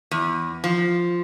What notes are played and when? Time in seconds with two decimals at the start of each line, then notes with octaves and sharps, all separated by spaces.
0.11 E2
0.64 F3